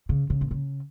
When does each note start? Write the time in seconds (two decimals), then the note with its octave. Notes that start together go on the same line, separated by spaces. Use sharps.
0.09 C#3
0.30 C#3
0.41 A#2
0.51 C#3